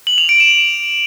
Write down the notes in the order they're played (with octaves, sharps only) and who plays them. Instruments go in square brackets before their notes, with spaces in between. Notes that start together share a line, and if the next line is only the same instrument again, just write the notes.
[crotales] F#7
F7
D7
E7